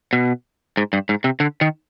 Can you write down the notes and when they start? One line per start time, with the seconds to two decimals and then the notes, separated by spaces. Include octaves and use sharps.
0.13 B2
0.77 G#2
0.93 G2
1.09 G#2
1.24 C3
1.40 D3
1.61 D#3